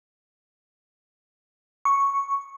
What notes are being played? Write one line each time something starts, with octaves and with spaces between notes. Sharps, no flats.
C#6